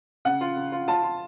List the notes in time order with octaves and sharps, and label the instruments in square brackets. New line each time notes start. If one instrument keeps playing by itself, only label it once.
[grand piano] C#3 [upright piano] F#5
[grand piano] F4
C#3
F4
[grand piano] F4 [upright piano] A5
[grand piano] F4